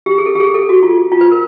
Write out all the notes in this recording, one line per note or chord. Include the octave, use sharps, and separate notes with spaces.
G4
G#4
A4
G4
G#4
A4
F#4
F4
F4
B4
A#4